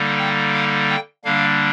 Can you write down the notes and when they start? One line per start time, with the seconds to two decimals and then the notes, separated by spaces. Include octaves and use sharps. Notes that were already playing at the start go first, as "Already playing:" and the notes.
Already playing: D3 G3 A#3 D#4
0.18 G5
0.54 F5
0.89 G5
1.24 D3 G3 A#3 D4 F5